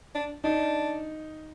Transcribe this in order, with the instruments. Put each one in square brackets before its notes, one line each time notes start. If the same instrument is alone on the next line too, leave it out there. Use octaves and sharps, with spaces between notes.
[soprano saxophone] D4
[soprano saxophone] D4 [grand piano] D#4